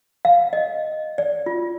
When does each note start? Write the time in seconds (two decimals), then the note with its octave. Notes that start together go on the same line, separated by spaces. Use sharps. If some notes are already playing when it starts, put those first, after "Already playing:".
0.25 F5
0.53 D#5
1.18 D5
1.46 F4